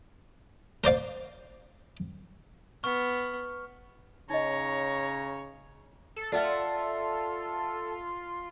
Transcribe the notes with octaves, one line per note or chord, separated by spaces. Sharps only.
A#4 C5 D5 F5
B3 C#6 F6
C#3 D#4 C#5 D#5 A#5
A4
F4 A4 D5 E5 F#5